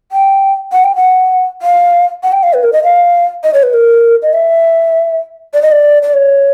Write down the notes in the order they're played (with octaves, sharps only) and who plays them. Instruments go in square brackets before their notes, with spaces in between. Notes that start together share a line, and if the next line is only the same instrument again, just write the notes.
[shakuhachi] G5
F#5
G5
F#5
F5
F#5
G5
F5
B4
A#4
D#5
F5
D#5
C#5
B4
A#4
D#5
E5
D5
D#5
D5
D5
C#5